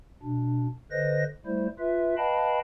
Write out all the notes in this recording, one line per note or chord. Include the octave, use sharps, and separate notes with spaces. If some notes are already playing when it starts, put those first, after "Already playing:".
B2 D4
D3 B4 C5 D#5 A#6
G3 A3 E4 C5
F4 B4 E5
B4 D#5 F5 G5 A5 B5